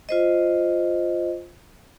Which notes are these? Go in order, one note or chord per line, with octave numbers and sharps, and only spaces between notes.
F4 C5 D#5